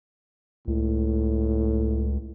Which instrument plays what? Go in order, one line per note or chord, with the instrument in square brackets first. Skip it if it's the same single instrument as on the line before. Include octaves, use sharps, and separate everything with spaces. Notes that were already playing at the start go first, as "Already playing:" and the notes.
[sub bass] C#2 [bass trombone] A2